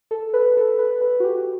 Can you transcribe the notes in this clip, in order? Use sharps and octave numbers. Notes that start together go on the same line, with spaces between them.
A4
B4
A4
B4
B4
F#4
G4